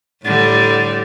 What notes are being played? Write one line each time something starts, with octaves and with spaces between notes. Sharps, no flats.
A2 D3 G3